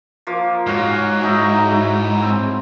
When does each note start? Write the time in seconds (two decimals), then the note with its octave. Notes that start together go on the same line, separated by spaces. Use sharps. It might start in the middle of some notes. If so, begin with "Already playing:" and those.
0.27 F3 A#3 D6
0.67 G#2 F#4 C#5 F5
1.21 F#3 D#4 E4
2.20 C4 E6